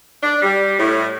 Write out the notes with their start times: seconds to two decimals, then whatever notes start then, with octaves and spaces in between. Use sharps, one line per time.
0.23 D4
0.42 G3
0.78 A2